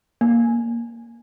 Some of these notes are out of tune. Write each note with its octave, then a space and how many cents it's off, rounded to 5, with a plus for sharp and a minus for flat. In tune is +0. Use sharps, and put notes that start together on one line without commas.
A#3 -5